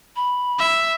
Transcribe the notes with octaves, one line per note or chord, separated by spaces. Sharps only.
B5
E5